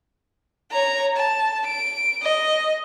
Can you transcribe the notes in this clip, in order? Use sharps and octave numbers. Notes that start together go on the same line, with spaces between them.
C#5 A#5
A5
D7
D#5